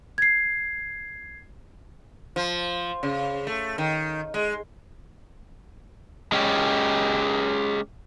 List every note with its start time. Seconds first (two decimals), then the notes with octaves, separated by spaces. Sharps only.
0.18 G#6 C7
2.36 F3
3.03 C#3
3.47 A3
3.78 D#3
4.34 G#3
6.32 G#3 C#4 G4